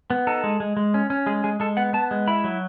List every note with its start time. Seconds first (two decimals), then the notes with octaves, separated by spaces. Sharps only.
0.10 B3
0.27 D#4 A4
0.44 G#3
0.60 G#3
0.77 G#3
0.94 C#4
1.10 C#4
1.26 G#3 G#4
1.44 G#3 G#4
1.60 G#3 A4
1.77 B3 F#5
1.93 B3 A5
2.11 G#3
2.27 E4 B5
2.44 F#3